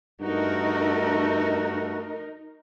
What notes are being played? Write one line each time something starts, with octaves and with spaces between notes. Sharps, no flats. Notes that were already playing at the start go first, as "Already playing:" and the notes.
G2 A3 D#4 F#4 A#4